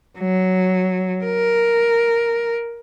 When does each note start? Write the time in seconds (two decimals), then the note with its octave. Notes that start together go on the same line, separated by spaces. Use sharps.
0.19 F#3
1.24 A#4